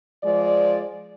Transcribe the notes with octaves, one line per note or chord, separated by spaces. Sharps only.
F3 G#3 D5